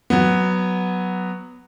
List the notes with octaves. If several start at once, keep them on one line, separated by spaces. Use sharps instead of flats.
F#3 B3